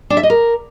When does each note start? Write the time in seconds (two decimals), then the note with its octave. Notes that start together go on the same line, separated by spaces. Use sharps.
0.10 D4
0.17 E5
0.23 D#5
0.30 A#4